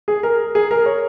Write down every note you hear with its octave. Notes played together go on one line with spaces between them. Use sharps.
G#4
A#4
G#4
A#4
C#5